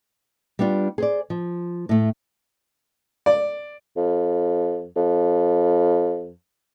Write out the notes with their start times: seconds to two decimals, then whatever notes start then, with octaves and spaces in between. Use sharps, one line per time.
0.59 G3 B3 D4 F4
0.98 G#4 C5 D5
1.30 F3
1.89 A2 A3
3.26 D5
3.96 F2
4.96 F2